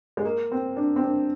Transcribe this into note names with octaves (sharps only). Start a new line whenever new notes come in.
G#3
A#3
C4
D4
C4
D4